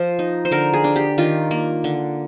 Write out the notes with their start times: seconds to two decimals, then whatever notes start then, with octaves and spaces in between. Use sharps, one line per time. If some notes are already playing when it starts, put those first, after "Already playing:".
Already playing: F3 C5
0.19 D#4
0.45 C5
0.51 D3 A#4
0.74 G#4
0.84 D4
0.96 G4
1.18 D#3 F4
1.51 A#3
1.84 D3